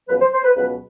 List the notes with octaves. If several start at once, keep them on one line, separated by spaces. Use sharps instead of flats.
C#2 B2 F#3 B4
C5
C5
B4
C#2 B2 F#3 B4